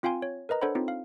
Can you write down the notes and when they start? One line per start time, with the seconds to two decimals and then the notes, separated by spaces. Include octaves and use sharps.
0.03 C4 F4 F5 G5 G#5 C6
0.22 C#5
0.49 A#4 B4 D#5 A#5
0.62 D4 A4 C5 C#5 F#5 B5
0.75 C4 D#4 F4
0.88 F5